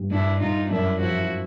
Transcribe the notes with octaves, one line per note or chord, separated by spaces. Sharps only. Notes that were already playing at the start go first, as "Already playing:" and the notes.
Already playing: G2 G3
G2 D4 E4
G2 D#4 F4
F#2 D4 E4
F3 E4 F#4